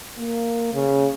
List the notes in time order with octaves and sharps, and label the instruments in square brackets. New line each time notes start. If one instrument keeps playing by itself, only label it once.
[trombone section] A#3
C#3